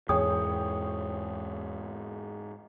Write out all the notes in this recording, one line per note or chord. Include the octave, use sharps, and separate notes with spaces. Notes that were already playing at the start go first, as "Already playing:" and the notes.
E2 G#2 E3 G#4 C#5 G5 D#6